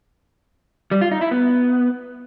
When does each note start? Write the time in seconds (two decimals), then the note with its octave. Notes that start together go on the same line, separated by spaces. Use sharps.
0.91 G3
1.01 F4
1.11 D#4
1.21 E4
1.31 B3